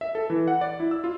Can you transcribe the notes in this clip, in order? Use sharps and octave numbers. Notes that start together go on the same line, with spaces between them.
E5
A4
E3
F#5
D5
E4
E6
F4